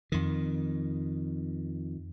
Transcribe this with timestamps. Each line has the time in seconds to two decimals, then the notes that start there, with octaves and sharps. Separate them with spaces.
0.12 F2 D#3